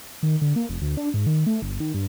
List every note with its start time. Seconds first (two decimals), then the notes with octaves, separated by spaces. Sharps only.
0.23 D#3
0.41 D3
0.56 A#3
0.69 F1
0.81 D2
0.97 D4
1.14 G#2
1.26 D#3
1.46 A3
1.62 G1
1.80 D#3
1.94 G2